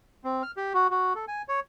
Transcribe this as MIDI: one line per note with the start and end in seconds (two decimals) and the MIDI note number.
0.24 0.43 60
0.43 0.51 89
0.57 0.73 67
0.74 0.87 66
0.90 1.13 66
1.15 1.25 69
1.28 1.42 80
1.48 1.60 73